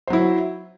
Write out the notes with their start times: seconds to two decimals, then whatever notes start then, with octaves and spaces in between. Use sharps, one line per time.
0.07 C5
0.10 F#3
0.13 E4